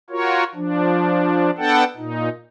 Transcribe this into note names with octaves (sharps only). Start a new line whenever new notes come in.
F4 F#4 A#4 C#5
F3 D4
B3 D4 A4 F#5 G5 A5
A#2 D#4